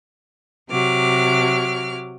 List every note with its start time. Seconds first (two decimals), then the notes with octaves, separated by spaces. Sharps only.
0.70 C3 F#3 D6 F6